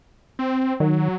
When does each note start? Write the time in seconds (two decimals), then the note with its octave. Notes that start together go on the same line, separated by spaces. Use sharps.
0.39 C4
0.80 D#3 F#3